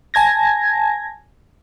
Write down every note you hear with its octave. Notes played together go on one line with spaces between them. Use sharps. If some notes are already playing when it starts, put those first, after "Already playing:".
G#5 A5 G#6 A#6